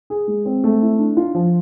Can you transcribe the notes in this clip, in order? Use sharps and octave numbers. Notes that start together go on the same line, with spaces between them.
G#4
G#3
C4
A3
E4
D4
F4
F3